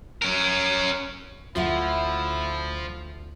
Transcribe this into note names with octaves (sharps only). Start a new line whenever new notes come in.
C#4 A#4
D2 F3 E4 F4 E5 F#5